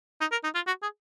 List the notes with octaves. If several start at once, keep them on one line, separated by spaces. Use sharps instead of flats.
D#4
A#4
D#4
F4
F#4
G#4